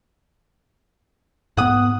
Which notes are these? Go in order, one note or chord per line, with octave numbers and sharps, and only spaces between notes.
G#2 B3 F#5 D#6